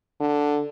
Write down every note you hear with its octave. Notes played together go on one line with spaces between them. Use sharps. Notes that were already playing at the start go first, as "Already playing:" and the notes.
D3